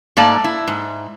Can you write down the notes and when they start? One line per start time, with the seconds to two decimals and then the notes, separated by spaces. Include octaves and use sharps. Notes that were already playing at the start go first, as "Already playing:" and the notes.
0.17 G#2 A3 A#3 D5 A5 A#5
0.44 E4
0.68 G#2